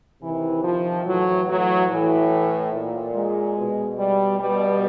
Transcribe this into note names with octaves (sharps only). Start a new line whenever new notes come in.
C3 D#3 E3
F3
A2 E3 F#3
F#3
A2 E3
A#2
G#3
B2
G3
B2 G3